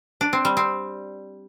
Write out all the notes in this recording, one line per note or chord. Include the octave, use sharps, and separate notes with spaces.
D4
C4
G3
C4